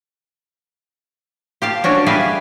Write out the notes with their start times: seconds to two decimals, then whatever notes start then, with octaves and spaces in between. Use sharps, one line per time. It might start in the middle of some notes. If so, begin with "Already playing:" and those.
1.62 G4 F5 A5
1.84 C#4 D4 F#4
2.06 G3 G#4 B4 D5 E5 F5